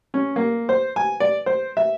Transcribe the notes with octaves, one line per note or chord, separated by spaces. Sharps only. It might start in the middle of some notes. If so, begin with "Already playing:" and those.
C#4
A#3
C5
G#5
D5
C5
E5